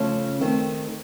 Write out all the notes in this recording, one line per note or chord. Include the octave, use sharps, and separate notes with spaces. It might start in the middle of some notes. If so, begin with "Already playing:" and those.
Already playing: C#3 F3 A3 C#4
D#3 A3 C4